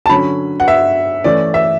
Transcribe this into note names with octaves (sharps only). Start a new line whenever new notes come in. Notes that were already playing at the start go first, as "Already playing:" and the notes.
A5
D3 F#3 C#4 B5
F#5
E5
E3 A3 C#4 D5
E5